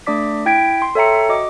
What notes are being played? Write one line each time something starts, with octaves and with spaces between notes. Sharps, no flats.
A3 D4 D5 D6 B6
E4 G5 G#6 B6 D7
C6
A4 C#5 E5 G5 A#5 C#7
F#4 D#5 D6